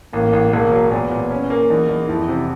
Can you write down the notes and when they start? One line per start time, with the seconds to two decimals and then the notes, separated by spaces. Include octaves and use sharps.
0.13 A1 A#3
0.33 A1
0.53 E1 A#3
0.72 F#3
0.91 A#2 B3
1.11 A#2
1.31 C#4
1.50 A#3
1.70 E2 D#4
1.89 E2
2.08 F2 E4
2.28 C3